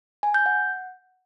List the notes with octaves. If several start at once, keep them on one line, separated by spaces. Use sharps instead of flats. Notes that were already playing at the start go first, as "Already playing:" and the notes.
G#5
G6
F#5